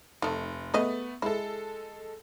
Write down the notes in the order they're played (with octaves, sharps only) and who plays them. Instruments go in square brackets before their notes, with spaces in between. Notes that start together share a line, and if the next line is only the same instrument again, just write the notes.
[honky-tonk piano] F1 [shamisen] D#3 A3
[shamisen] G#3 G#4 D#5 [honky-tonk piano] A3 B3
[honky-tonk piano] G#3 A4 [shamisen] E4